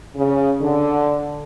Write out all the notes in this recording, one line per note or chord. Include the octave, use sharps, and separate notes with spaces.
C#3
D3